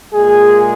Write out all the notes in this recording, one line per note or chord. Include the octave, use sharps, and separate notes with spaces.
A#2 G#3 G#4